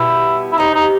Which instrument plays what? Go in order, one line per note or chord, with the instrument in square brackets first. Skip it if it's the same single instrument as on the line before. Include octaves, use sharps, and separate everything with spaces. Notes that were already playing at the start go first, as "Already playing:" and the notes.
Already playing: [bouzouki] B2 G3 B3 [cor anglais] E4
[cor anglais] E4
[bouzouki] C3 E3 G3 [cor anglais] D#4
[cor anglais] D#4